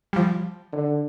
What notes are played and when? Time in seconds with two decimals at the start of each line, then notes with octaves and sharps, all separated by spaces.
0.13 F3 G3
0.73 D3